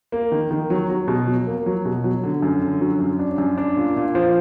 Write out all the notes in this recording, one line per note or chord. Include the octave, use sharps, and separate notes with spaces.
A#3
D#3
D#3
F#3
F#3
B2
F#3
A#3
F#3
B2
F#3
D3
F#2
D3
F#3
F#2
D4
F#2
D4
A#2
A#2
F3